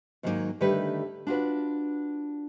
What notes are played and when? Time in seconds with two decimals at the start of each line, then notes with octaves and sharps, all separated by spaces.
0.23 G#2 D#3 F#3 G3 A#3 D#4
0.60 D3 D#3 G3 A3 G4 B4
1.27 D4 F4 F#4 B4